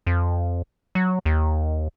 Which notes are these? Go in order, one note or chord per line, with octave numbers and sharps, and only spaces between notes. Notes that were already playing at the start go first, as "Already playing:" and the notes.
F2
F#3
D#2